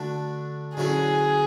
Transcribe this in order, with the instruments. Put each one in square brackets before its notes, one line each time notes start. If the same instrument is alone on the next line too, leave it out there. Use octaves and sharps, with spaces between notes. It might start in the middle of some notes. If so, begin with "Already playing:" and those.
Already playing: [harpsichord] D3 A3 D4 F#4
[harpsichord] D3 F#3 C#4 E4 [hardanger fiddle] G#4